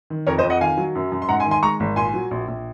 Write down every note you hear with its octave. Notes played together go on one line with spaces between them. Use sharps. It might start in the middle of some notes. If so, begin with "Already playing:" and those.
D#3
F2 A#4 C#5
C5 D#5
F2
D#5 F#5
D#3 F5 G#5
F#3
F#2
F#2
C6
G#2 F#5 A#5
G#5 C6
D#3
G#5 C6
G#3 A#5 C#6
G#1
A#2 G#5 C6
F#3
A#1
A#1